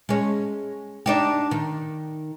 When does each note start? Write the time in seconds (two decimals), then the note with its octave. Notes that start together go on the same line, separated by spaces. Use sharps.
0.09 G#3 C#4
1.06 D4 D#4 G4
1.51 D#3